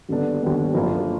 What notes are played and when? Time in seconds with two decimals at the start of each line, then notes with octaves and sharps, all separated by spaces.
0.09 D#2 D3 G3 B3 D4
0.42 D#2 D3 G3 B3 D4
0.74 G1 F#2 D3 F3 A#3